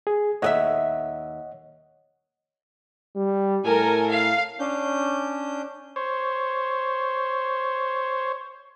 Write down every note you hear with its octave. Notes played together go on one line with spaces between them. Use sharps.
G#4
D#2 G#4 C#5 D#5 E5 F#5
G3
A2 A4 A#4 G#5
F5
C#4 D4 G6
C5 C#5